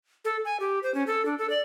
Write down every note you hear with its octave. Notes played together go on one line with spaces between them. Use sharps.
A4
G#5
G4
C5
C#4
A4
D4
A4
D5